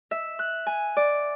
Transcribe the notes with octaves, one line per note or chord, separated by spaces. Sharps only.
E5
F#6
G#5
D5